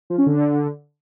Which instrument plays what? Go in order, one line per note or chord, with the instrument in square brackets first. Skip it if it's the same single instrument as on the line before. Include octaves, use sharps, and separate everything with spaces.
[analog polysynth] F3
C#4
D3